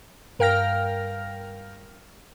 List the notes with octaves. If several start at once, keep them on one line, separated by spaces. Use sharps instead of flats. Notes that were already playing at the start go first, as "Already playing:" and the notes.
G2 A#4 F5 G5 F6 A#6